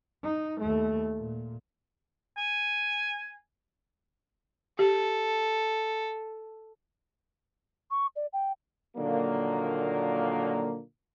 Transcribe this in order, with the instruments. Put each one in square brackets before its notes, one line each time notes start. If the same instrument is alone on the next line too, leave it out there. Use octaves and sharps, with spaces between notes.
[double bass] D#4
D#2 A3
A#2
[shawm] G#5
[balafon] G4 [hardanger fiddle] A4
[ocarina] C#6
D5
G5
[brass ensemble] A#2 D3 D#3 F3 F#3 A#3